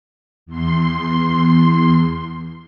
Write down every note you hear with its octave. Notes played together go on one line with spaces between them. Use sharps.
E2 C6